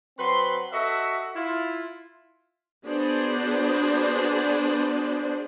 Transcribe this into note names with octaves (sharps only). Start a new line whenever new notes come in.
F#3 C4 B4 C6
F#4 A4 D#5 E5
E4 F4
B3 D4 F#4 G#4 C5